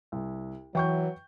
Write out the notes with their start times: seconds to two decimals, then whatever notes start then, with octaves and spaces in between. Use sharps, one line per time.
0.12 C2
0.75 E3 F#3 G5 C#6 G6